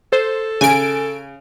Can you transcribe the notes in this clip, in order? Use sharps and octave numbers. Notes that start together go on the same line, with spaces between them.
A4 C5
C#3 G#5 D7